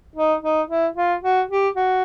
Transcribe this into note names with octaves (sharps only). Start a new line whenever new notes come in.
D#4
D#4
E4
F4
F#4
G4
F#4